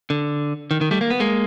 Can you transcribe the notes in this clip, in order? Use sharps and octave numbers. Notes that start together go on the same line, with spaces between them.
D3
D#3
D#3
G3 A3
A#3
B3
G#3 A#3